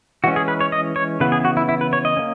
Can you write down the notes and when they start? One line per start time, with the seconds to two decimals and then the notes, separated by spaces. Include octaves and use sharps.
0.24 E3 G#3 C#4 F#4
0.36 G#4
0.48 B4
0.61 C#5
0.72 D#5
0.96 C#5
1.20 C#3 E3 B3 B4
1.32 G#4
1.45 F#4
1.57 E4
1.69 E4
1.81 B4
1.93 C#5
2.05 D#5
2.17 A#3 C#4